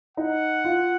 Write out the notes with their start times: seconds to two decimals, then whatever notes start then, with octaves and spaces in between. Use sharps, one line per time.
0.17 D#4 F#5
0.65 F4